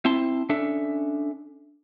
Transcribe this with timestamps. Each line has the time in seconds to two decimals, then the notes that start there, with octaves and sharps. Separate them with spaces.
0.05 C4 E4 A5 C6
0.49 C#4 D4 A4 E5